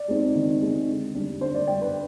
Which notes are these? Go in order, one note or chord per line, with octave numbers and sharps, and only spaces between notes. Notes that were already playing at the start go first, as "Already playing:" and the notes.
Already playing: D5
G#3 C4 D#4
D#3
G#3 C4 D#4
D3
G3 D4
D3 C5
D5
G3 D4 G5
B4